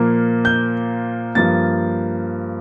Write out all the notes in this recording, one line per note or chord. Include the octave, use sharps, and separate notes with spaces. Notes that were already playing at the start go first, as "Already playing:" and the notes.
Already playing: A#2 F3 A#3
G6
G2 F3 A#3 A6